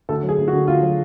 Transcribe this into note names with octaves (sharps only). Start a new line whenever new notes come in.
D2 A4
F#3
G#4
D2
F#4
D3
D2 F4
F#3